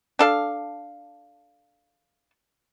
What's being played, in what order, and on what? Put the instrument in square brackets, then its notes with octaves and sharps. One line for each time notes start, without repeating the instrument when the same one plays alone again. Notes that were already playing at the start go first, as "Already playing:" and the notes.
[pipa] D4 A4 F5